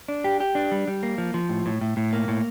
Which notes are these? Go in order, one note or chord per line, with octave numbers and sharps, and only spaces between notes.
D4
G4
G4
D4
G3
G3
A#3
F3
F3
A2
A2
A2
A2
A#3
A2